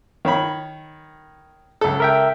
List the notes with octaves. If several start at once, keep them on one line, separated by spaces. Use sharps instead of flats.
D#3 C#5 B5
C#2 A4
A#4 E5 G5